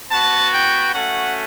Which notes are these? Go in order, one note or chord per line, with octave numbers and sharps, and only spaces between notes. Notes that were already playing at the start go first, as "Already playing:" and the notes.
B3 F#4 A5
G5
A3 C#4 F#4 F#5